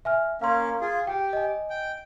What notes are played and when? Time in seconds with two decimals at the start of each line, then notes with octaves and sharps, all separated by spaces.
0.05 E5 G#5 F6
0.41 A#3 C#4 F5 C6
0.81 F4 G#4
1.07 G4 G5
1.33 D#5 G#5
1.70 G5